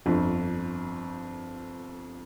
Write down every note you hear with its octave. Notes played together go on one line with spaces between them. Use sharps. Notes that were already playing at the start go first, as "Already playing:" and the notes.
G1 F2